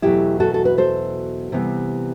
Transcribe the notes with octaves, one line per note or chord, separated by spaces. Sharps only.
E2 B2 F#3 A3 E4 G4
F#4 A4
A4
B4
A4 C5
C3 E3 G3 B3